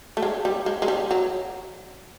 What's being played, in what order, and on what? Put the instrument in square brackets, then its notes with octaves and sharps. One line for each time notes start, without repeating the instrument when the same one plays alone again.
[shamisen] A3
G#3
G3
G#3
G#3
G3
F#3